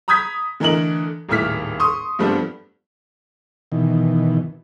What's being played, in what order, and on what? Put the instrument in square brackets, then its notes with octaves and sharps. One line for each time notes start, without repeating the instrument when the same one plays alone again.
[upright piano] A#5 B5 D#6 G6 G#6 B6
D3 E3 A3 A#4 D#5 F#7
D#1 G#1 A2 E4 F6 B6
C6 C#6 D#6
G2 F3 G3 A3 B3 C4
[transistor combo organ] B2 D#3 E3